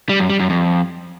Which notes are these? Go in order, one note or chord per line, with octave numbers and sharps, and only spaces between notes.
G3
F#2
G3
F#2
F2